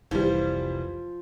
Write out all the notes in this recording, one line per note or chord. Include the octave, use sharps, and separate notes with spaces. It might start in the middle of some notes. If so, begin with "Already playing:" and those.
F1 C2 E3 F3 G3